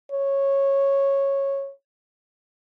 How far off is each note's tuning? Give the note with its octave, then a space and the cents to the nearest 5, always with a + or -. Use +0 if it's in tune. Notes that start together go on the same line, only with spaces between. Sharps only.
C#5 -10